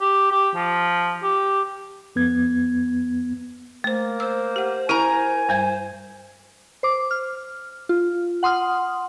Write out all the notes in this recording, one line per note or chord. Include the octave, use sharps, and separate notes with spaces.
G4
G4
F3
G4
F2 B3 G#6
A3 A#3 C5
C5 E6
G4 F#5
E4 A#4 G#5 A#5
G2 G3 C5 G#6
C5 D6
F6
F4
F#5 C6 D#6 F6